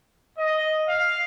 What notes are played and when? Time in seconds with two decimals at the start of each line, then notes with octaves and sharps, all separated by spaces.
0.38 D#5
0.89 F5